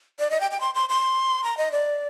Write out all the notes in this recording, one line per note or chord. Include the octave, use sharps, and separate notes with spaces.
D5
D#5
G5
G5
C6
C6
C6
A#5
D#5
D5